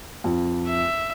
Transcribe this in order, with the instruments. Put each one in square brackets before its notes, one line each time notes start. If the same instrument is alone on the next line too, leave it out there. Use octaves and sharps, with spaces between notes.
[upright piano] F2
[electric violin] E5